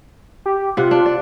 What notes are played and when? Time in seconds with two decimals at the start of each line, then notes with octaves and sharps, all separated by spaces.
0.46 G4
0.77 C3 F4 F#5
0.91 D4
1.06 D5